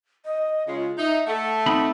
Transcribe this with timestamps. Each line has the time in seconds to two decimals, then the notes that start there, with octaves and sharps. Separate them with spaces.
0.25 D#5
0.68 C#3 G#3 F4
0.97 D#4 E5
1.27 A3 F#5
1.66 C4 D#4 B5